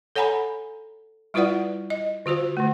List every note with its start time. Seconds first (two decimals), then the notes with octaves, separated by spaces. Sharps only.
0.16 A4 C#5 F#5 G#5 A#5 B5
1.34 G3 E4 F4 B4 D5 F#5
1.90 D#5
2.26 D3 F4 F#4 C5
2.57 D3 A3